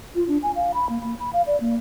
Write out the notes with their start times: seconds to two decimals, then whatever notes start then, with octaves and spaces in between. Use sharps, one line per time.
0.15 F4
0.28 D4
0.43 G#5
0.56 F5
0.74 B5
0.89 A#3
1.02 A#3
1.20 B5
1.33 F5
1.47 D5
1.60 A#3